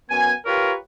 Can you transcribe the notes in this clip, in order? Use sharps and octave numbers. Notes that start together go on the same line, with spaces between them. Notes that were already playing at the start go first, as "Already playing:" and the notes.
F#2 B3 G#5
F4 G4 A#4 B4 C#5